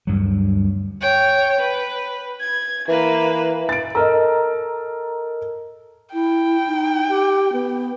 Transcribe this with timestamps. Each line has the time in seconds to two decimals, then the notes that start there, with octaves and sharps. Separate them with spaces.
0.07 D2 G2 F#3
1.01 C#5 G5
1.59 B4
2.41 G#6
2.89 E3 A#3 B4
3.69 A6 D7
3.95 A4 A#4 D#5 A#5
6.13 E4 G5
6.67 D#4
7.09 G4
7.53 B3